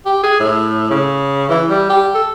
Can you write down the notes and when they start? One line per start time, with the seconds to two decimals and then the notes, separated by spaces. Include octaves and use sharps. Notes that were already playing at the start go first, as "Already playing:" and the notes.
0.06 G4
0.23 G#4
0.40 A2
0.90 C#3
1.49 E3
1.70 G3
1.89 G4
2.15 A4